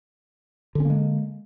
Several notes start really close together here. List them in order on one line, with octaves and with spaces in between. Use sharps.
D3 C#4 A#3 G#3